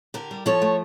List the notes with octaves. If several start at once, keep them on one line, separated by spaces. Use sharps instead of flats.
D3 G4 A#4
G3
F3 A4 C#5
A3